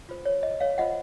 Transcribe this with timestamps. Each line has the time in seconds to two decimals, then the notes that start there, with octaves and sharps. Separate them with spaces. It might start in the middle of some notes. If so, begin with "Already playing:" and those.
0.09 F4 C5
0.25 C#5
0.43 D#5
0.60 C#5 F5
0.78 F4 C5 D#5 F#5